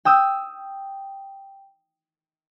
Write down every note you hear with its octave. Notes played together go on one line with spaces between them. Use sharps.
G5 D#6 E6